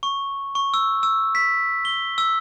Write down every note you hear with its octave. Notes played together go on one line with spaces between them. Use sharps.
C#6
C#6
E6
E6
B6
G7
E6